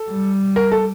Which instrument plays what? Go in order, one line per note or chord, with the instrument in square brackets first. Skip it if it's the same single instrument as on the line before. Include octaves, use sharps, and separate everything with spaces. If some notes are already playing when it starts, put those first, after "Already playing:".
Already playing: [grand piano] A4
[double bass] G3
[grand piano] A#4
A4